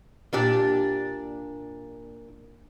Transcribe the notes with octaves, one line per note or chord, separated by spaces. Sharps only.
A#2 D4 G4